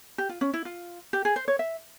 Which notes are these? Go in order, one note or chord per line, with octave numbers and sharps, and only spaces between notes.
G4
F4
C#4
E4
F4
G4
G#4
C5
C#5
E5